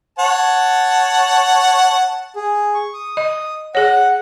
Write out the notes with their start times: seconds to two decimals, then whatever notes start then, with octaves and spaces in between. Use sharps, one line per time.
0.19 C#5 F#5 A5
2.36 G#4
2.74 C#6
2.94 D#6
3.17 D#5
3.75 G#4 C#5 F#5